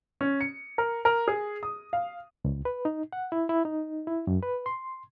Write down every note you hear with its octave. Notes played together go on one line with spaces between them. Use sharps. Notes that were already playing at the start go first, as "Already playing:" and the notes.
C#4
C#7
A#4
A#4
G#4
D#6
F5
C#2
B4
D#4
F#5
E4
E4
D#4
E4
F#2
B4
C6